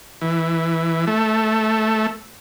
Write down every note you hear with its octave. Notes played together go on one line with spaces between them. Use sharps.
E3
A3